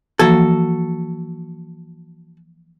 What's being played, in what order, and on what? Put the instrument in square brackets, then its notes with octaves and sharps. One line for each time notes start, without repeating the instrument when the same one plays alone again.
[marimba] E3 F3 A#3 [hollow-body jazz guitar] F#4 A4